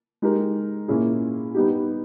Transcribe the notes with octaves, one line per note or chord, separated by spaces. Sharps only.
G#3 D#4 G4 A#4
A#2 A#3 C#4 E4 G#4
G3 B3 D#4 G4